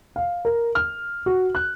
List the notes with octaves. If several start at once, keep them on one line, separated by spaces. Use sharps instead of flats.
F5
A#4
F6
F#4
F#6